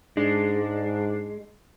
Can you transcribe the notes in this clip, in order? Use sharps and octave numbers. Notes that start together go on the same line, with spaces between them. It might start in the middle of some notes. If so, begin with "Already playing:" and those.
G#2 G#3 D4